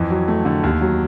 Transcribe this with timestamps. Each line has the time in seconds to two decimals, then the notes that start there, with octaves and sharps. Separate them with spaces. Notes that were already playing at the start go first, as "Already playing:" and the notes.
Already playing: F2 E3
0.10 F#3
0.28 A3
0.45 D3
0.63 D#2
0.81 F#3